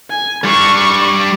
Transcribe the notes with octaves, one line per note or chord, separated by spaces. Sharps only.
G#5
G3 D4 C#6